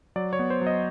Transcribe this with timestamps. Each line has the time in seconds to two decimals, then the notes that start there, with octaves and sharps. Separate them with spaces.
0.16 F#3 D5
0.33 C#5
0.39 B3
0.50 C5
0.61 F#3
0.67 D#5